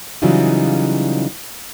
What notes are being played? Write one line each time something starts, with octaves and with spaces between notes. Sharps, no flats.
C#3 E3 F#3 G3 D#4 F4